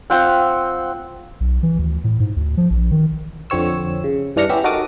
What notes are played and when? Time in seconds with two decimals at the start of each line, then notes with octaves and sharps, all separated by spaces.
0.10 C4 F4 F#5 G5
1.40 B1
1.63 E3
1.79 D2
2.04 A2
2.20 G#2
2.36 D2
2.57 F3
2.70 A#1
2.91 D#3
3.50 F2 D3 C4 C#5 E6
4.04 C#3
4.36 G2 E3 D4 F6 A#6 C#7
4.49 B3 C#4 G4 E5
4.64 D#4 F#4 A4 A#4 D6 D#6